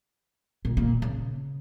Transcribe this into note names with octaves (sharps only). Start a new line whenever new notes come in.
A#2
A#2
C#3